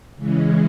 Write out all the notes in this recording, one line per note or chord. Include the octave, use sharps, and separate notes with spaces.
C#3 E3 G#3 C#4